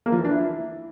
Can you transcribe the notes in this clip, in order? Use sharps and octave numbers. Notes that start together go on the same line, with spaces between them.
A#3
F3
E3
D4
E4